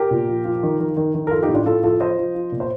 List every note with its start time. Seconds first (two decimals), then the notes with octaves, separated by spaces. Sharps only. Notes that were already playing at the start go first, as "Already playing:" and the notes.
Already playing: G4 A#4
0.11 A#2
0.28 F3
0.45 F3
0.63 D#3
0.80 D#3
0.97 D#3
1.15 D#3
1.27 A#4
1.31 F3 F4 A4
1.43 D#4 G4
1.49 A2
1.54 D4 F4
1.66 A2 F4 A4
1.83 F3 F4 A4
2.00 F3 C5 D#5
2.18 F3
2.35 F3
2.52 A#2
2.60 C5